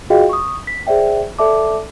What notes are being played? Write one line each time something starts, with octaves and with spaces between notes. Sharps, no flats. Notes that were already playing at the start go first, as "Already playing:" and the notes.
F4 F#4 G#4 D#5 F5 G5
C#6 D#6
B6
G#4 C5 D5 E5 G5
A4 D5 E5 A5 D6